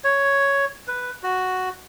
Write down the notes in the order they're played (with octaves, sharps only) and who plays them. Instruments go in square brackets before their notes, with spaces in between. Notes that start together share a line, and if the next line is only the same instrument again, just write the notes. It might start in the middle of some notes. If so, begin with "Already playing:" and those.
[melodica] C#5
B4
F#4